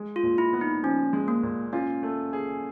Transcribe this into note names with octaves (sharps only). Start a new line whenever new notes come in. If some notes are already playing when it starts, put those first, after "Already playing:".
Already playing: G#3
F4
A#2
E4
B3
D#4
F3 C#4
G#3
A#3
A#2
C#4 F4
A3
G#4